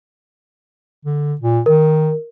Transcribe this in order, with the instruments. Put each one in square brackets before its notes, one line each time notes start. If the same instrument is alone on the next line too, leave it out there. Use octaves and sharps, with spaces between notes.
[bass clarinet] D3
A#2
[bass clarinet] D#3 [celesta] A#4